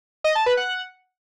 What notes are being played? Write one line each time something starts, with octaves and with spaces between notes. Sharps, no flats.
D#5
A5
B4
F#5